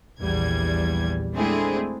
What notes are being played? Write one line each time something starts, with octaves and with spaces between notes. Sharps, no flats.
A#1 E2 G3 G#6
G#3 A3 C4 D4 E4 G#4